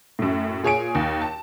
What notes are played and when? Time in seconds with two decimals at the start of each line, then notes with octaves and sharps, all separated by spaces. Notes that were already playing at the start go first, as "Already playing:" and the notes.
0.19 F#2 A2
0.63 A#2 G#4 C#5 G#5 D7
0.95 D#2
1.22 A5